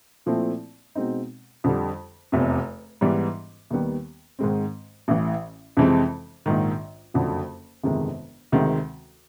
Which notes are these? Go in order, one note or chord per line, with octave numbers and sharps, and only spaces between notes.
A#2 F3 A3 C4 E4
B2 G#3 C4 D#4
F2 D3 G3
F1 E2 C3
G#2 E3 G3 B3
D#2 D#3 G3 B3
G#2 D#3 G#3 C4
A1 A2 E3
F2 C3 E3 G#3 C4
A#1 G#2 D#3
F#1 F2 D3 F#3
G1 F2 C3 D#3 G#3
D2 C3 D#3 G#3 C4